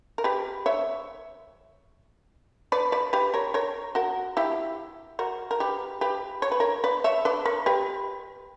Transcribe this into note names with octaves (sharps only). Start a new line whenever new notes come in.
A#4
G4 B4
C#5 E5
B4 D5
B4 D5
G4 B4
A#4 C#5
A#4 C#5
F#4 A#4
E4 G4
F#4 A#4
A#4
G4 B4
G4 B4
C#5
B4
A#4 C#5
B4 D5
C#5 E5
B4 D5
A#4 C#5
G4 B4